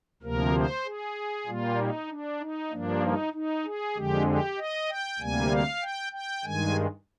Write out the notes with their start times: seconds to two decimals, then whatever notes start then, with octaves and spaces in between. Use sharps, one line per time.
0.22 D2 C3 F3 A#3 A#4
0.54 C5
0.85 G#4
1.47 A#2 G3 A#3 F4
1.78 D#4
2.10 D4
2.40 D#4
2.71 G2 F3 A#3 D4
3.02 D#4
3.33 D#4
3.65 G#4
3.95 F2 D3 G#3 G4
4.27 G4
4.58 D#5
4.89 G5
5.19 D2 C3 G3 A#3 G#5
5.51 F5
5.82 G5
6.13 G5
6.44 G2 D#3 G#3 G#5